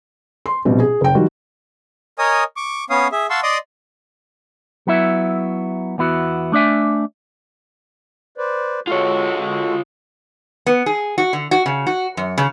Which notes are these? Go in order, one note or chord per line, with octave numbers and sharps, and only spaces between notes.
C6
A#1 B2 G3 C4
G#4
F#1 G5
D#3 F3 G3 F#4
A#4 C#5 D#5 G#5 D#6
C#6 D6
B3 C#4 C#5 F5 D#6
G#4 E5
F5 F#5 A5 C6 C#6 E6
D5 D#5 C6 D6 D#6
F#3 B3 E4 E5
E2 B3 E4 F#4
A3 D4 D5 E5 G#5
B4 C5 D5
G#3 F4 F#4 A4 C#5
B3
G#4
F#4
D3
F#4
C#3
F#4
F#2
C#3